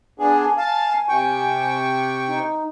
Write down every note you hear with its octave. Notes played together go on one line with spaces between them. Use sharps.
B3 D4 G#4 G#5
G#5
F5 A5
C3 G5 C#6
D#4